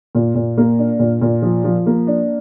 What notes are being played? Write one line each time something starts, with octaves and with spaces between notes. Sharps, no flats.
A#2
A#2
A#3
D4
A#2
A#2
F3
F3
A#3
D4